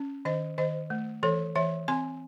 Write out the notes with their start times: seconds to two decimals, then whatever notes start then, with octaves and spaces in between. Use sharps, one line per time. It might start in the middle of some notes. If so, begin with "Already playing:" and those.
Already playing: C#4
0.25 D#3 C5 D#5
0.58 D#3 C5 D#5
0.90 A3
1.23 E3 A4 C#5
1.55 E3 C#5 E5
1.88 C4 G#5 C6